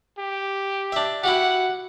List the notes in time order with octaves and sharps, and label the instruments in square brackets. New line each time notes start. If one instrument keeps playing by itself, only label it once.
[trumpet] G4
[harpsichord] D4 E5
[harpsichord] E4 F#4 G4 [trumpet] F#5